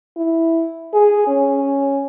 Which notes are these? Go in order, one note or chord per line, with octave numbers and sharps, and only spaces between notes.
E4
G#4
C#4